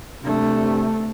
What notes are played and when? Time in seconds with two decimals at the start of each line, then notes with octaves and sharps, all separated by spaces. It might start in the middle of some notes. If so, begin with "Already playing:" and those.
0.24 C3 A3 D4